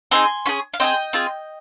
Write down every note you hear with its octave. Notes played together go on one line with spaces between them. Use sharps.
C4 D#4 G#4 G#5 C6
C#4 F4 G#4
F5
C4 F4 G#4 D#5 G5
C4 F4 G#4